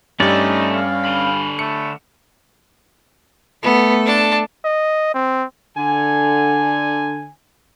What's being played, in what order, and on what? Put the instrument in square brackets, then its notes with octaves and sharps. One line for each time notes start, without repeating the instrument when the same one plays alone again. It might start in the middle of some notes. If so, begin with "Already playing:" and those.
[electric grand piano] G2 G3 [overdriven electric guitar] A3 [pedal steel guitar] C#4 D5 [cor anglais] D#4
[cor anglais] F5
[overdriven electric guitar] D3 B5
[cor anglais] A3 [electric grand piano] C#7
[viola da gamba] A3 A4 [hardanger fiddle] B3
[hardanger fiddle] D4 A5
[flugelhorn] D#5
C4
[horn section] D3 G#5